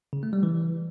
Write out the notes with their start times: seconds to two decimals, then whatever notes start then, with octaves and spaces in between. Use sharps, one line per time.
0.13 C#3
0.23 A3
0.33 G3
0.43 E3